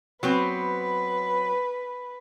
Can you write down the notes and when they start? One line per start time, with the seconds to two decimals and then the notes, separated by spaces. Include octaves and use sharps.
0.23 F#3 B3 C4 B4